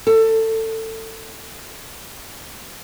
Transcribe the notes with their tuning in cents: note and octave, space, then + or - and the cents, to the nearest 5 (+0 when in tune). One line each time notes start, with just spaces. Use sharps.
A4 +20